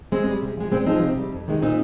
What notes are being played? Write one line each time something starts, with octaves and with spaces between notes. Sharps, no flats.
G#2 G#3 C4
G3
C3
F3 G#3
A#2 G#3 C4
F3 G#3 C4 D#4
C3
G3
F2
C3 D#3 G#3
A#2 C4 D#4